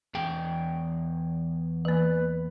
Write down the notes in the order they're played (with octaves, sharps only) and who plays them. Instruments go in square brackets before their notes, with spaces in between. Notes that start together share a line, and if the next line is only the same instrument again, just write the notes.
[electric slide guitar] E2 G#4 G5
[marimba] E3 A#3 [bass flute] B4